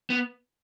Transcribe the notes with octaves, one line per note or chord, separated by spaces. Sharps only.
B3